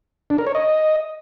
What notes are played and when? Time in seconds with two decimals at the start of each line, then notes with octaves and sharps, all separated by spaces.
0.30 D4
0.38 A#4
0.47 C#5
0.55 D#5